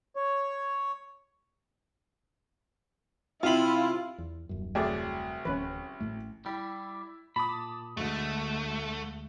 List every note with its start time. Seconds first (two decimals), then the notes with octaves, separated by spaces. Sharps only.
0.16 C#5
3.43 C3 E4 F4 B5
4.18 E2
4.49 D#1 F#2
4.75 C2 F#3 A3 G#4 D5
5.45 D1 E3 C#4 B4
6.00 A1 A2 A3
6.46 G3 E4 G4
7.36 A#2 A5 B5 D6 D#6
7.97 D2 B2 D3 G#3 A3